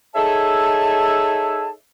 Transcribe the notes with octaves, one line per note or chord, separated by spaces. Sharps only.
D#4 G#4 A4 C#5 E5 A5